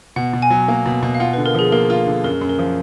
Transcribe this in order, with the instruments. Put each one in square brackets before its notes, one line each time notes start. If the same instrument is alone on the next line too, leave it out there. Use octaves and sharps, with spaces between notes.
[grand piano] B2 [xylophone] F#5
[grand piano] B2
[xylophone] G#5
[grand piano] F#3
A#3
B2
B2
[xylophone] F5
[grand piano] F4 [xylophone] F#5
[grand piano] D3 [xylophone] B4
[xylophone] A#4
[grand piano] F3 [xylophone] G#4
[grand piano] A#3 [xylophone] A#4
[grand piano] F4
D3
[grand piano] F#2 [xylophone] A#4
[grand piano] F#2
[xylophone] A#4
[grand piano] F3